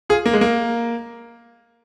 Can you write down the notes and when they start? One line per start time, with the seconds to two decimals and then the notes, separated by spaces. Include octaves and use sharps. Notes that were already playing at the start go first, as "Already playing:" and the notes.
0.09 F4 G#4
0.26 A#3
0.33 G#3
0.41 A#3